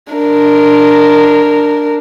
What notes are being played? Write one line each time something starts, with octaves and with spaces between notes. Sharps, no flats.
D4 A#4